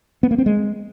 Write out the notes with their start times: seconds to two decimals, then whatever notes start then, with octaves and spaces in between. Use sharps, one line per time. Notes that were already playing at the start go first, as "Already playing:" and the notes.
0.23 B3
0.31 A#3
0.38 C4
0.46 G#3